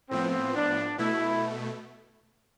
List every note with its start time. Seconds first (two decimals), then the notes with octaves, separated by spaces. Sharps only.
0.10 A2 F3 B3 C4
0.55 D4
0.98 B2 A3 E4